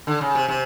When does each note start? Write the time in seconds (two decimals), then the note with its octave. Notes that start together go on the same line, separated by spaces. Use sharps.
0.07 D3
0.21 C#3
0.35 C3
0.48 C3